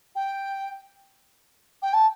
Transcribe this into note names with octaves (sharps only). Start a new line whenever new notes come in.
G5
G5
A5